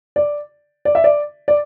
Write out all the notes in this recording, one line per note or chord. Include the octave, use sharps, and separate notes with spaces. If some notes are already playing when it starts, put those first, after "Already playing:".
D5
D5
E5
D5
D5